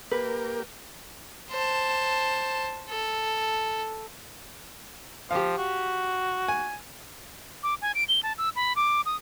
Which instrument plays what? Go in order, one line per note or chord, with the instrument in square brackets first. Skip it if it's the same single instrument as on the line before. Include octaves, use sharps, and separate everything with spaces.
[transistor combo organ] A#3 G4 [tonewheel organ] A#4 [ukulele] B4
[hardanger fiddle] C5 A5
A4
[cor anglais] F3 [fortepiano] G4 F5
[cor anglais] F#4
[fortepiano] G#5
[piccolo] D6
G#5
D7
G7
A5
E6
B5
D6
D#6